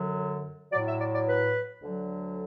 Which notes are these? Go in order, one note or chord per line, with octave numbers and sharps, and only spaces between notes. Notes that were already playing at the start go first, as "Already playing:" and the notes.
Already playing: F#2 D3 F#3
A2 F#3 D5
E5
D5
D5
B4
D2 D3 F#3